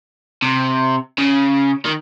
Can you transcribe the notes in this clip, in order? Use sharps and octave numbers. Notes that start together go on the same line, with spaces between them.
C3
C#3
D#3